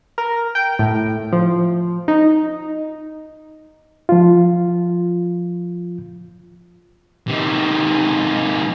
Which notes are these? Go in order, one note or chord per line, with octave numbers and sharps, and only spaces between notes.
A#4
G5
A2
F3
D#4
F3 F4
C3 D#3